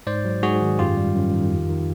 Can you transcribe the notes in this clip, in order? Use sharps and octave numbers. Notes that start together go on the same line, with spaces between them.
G#2 C5 D5
F#3
G#2 F#4 G#4
D#3
F#2 F4 G4
G3
F#2
D#3
F2
D#3